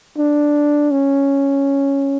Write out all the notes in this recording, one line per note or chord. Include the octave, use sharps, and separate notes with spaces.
D4
C#4